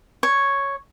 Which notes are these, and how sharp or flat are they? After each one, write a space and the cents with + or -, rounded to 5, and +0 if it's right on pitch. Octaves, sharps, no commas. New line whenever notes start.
C#5 +0